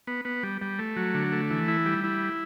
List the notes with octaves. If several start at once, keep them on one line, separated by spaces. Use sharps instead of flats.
B3
B3
G3
G3
A3
F#3
D3
A3
E3
E4
G3
E4